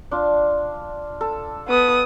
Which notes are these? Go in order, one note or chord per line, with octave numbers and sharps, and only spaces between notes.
D4 F4
A4
B3 D#6